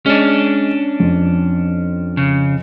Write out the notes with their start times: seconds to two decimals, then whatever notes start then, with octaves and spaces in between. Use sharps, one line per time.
0.06 G#3 C#4 D4
1.00 F2
2.17 C#3